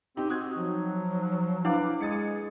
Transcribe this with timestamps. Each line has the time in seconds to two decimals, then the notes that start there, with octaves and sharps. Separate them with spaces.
0.17 C4 D#4 G4
0.30 C4 F#4 D#6 F#6 G#6
0.56 F3 F#3
1.65 D4 E4 B4 F5 F#5 D6
2.01 G#3 G#4 D#6 A6 C#7